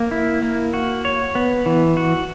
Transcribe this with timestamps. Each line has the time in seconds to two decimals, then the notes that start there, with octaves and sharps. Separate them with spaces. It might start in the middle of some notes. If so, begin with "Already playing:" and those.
Already playing: A#3
0.11 E4
0.42 A#3
0.74 F#4
1.05 C#5
1.35 B3
1.66 E3
1.97 F#4